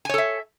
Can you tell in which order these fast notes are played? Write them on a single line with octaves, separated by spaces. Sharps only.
G#5 C#5 A4 E5